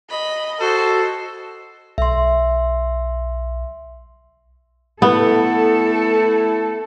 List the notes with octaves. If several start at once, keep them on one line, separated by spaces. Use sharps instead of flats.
D#5 B5
F#4 A4 C5
B1 E5 C6
A3 B3 E4 A4